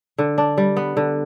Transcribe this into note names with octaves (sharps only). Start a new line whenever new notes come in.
D3
D4
G3
B3
D3